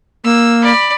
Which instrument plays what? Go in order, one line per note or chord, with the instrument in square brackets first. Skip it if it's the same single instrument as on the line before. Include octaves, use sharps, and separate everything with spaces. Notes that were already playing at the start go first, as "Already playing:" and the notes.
[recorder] A#3 [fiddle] E6
[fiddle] D5 B5